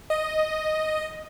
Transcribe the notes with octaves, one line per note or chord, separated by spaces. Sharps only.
D#5